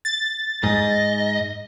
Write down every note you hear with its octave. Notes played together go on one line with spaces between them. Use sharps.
A6
G#2 D#5